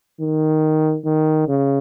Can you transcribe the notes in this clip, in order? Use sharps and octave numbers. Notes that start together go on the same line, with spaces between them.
D#3
D#3
C#3